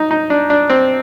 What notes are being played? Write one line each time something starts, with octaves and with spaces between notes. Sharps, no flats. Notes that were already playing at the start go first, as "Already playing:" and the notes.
Already playing: D#4
D#4
D4
D4
C4